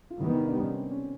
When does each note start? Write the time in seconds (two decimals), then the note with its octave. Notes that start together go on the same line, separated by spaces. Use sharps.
0.10 F4
0.20 C3 D#3 G3 B3 E4
0.34 D#4
0.47 D4
0.61 C#4
0.74 C4
0.91 C#4